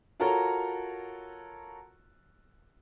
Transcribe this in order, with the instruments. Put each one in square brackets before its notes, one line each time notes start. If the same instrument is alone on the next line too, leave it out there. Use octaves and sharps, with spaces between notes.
[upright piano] F4 F#4 A4 A#4 C#5 A#5